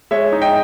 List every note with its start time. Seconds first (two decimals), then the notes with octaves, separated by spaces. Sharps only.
0.11 G#3 C#5 E5
0.32 D#4
0.42 D#5 G5